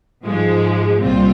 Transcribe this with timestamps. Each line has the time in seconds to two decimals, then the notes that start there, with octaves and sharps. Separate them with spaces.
0.24 G#2 F3 G#3
1.01 C2 A#2 G3 C4 F4